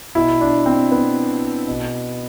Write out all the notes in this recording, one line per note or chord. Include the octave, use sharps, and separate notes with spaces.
B2 E4
D4
C4
B3
B2